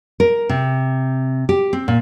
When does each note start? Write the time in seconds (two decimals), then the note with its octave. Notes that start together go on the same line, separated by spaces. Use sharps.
0.20 A#4
0.49 C3
1.49 G4
1.73 C4
1.88 A#2